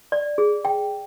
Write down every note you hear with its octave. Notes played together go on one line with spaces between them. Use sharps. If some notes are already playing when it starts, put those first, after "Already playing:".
D5
G#4
G5